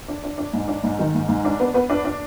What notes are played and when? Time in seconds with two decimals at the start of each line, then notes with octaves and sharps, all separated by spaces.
0.08 D4
0.24 D4
0.38 D4
0.53 G#2
0.68 D4
0.83 G#2
0.99 D#3
1.14 G#2
1.28 G#2
1.45 D4
1.60 B3
1.74 B3
1.90 D4
2.05 D4